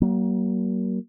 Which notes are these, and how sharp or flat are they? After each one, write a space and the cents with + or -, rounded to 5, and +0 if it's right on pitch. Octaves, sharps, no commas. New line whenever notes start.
F#3 +45 A#3 +15